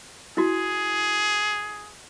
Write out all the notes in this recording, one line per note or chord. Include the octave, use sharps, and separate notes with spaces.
E4 F#4 G#4